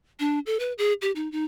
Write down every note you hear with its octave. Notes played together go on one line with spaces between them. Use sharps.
D4
A4
B4
G#4
G4
D#4
D#4